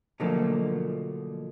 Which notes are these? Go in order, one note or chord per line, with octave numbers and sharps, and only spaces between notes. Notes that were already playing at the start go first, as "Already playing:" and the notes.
B2 D3 F3 F#3 A3 A#3